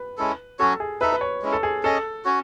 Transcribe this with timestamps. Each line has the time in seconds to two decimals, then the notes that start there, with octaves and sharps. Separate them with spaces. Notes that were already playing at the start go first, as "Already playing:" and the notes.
Already playing: B4
0.17 G#3 C#4 E4 A4
0.59 F#3 C#4 F#4 A4 C#5
0.80 G#4
1.01 D#4 A4 B4 E5
1.12 B4
1.21 C#5
1.42 G#3 C#4 E4
1.52 A4
1.63 G#4
1.83 C#4 G#4 A4 D#5
2.25 C#4 F#4 C#5